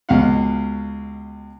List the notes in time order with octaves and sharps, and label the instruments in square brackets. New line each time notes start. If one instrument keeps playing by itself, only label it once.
[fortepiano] C#2 B2 F5 F#5